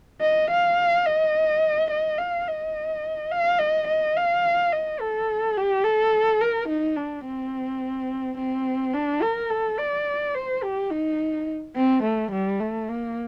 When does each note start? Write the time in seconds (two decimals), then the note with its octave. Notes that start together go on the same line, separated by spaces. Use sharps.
0.21 D#5
0.50 F5
1.06 D#5
1.91 D#5
2.18 F5
2.47 D#5
3.31 F5
3.59 D#5
3.88 D#5
4.16 F5
4.72 D#5
5.00 A4
5.57 G4
5.84 A4
6.41 A#4
6.68 D#4
6.96 D4
7.26 C4
8.37 C4
8.93 D4
9.23 A#4
9.50 A4
9.78 D5
10.35 C5
10.63 G4
10.90 D#4
11.76 C4
12.03 A3
12.32 G3
12.60 A3
12.88 A#3